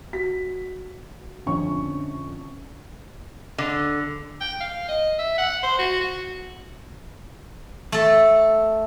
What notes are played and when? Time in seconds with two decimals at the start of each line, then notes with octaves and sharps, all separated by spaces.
0.13 F#4 B6
1.46 A#1 F2 D3 C#4 C#6
3.58 D3
4.41 G5
4.60 F5
4.88 D#5
5.18 E5
5.38 F#5
5.63 C5
5.79 F#4
6.01 F#4
7.92 A3 A4